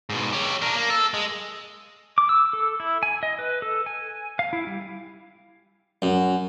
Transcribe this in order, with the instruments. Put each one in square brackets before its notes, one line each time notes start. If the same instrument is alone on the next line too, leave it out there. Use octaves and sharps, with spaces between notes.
[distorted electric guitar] G#2 B2
G4 C#5
D4 A#4
A#3
A4
G#3
[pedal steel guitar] D6
E6
A4
E4
G#5
D#5
B4
A4
G#5
F5
E4
G3
[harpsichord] F#2